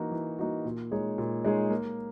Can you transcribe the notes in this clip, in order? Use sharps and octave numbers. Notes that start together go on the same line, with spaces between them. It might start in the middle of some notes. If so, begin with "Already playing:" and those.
Already playing: E3 A#3 D#4 F#4
E3
A#3 D#4 F#4
A#2
G#3 D#4 G#4 C#5
A#2
G#3 D#4 G#4 C#5
A#3